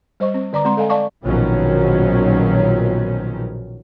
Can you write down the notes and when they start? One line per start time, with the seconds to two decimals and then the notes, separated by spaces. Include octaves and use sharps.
0.20 G3 C5 D#5 C#6
0.34 C4 C5
0.53 D3 D5 A#5 D6
0.65 G#3 C4 A#5 C6
0.77 A4 D#5 F5 G#5
0.89 D5 F5 A5 C#6 D6
1.24 A#1 B2 D#3 F3 F#3 C#4